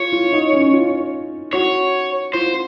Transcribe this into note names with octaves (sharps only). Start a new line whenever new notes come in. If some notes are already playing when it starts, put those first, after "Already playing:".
Already playing: F4 C#5
F4
D#4
C#4
F4
F#4 C#5
F4 C5